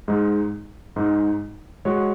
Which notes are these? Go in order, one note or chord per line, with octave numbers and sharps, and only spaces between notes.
G#2 G#3 D#4
G#2 G#3 D#4
G#3 F#4 C#5